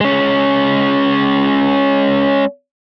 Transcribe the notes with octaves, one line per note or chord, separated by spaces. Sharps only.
G#3 C#4